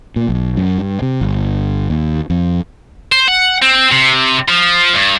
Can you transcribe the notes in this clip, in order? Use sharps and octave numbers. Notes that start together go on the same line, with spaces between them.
A#2
B1
F#2
G2
C3
G1
D#2
F2
C5
F#5
C4
C3
F3
G2